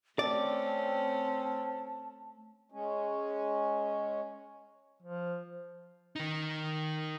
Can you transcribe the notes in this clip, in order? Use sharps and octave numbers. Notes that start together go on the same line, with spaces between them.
A3 C4 C#4 D5 A5
G#3 C#4
F3
D#3 D#4